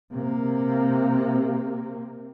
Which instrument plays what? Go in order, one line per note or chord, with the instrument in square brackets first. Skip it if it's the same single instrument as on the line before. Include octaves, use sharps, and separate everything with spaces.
[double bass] C3 A#3